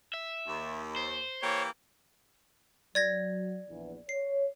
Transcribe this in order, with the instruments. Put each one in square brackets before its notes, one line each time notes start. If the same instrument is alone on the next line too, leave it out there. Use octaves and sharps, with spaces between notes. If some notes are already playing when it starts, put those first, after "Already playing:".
[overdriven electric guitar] E5
[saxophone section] D#2
[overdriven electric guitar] C5
[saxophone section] E3 A#3 G4 [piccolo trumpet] C#5
[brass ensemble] F#3 [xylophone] D5 G#6 A#6
[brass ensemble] A#1 E2
[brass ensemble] C#5 [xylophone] C7